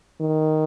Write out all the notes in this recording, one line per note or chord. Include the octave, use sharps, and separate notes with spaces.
D#3